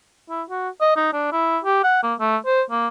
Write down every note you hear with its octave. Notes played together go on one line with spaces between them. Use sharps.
E4
F#4
D#5
D#4
D4
E4
G4
F#5
A#3
A3
C5
A#3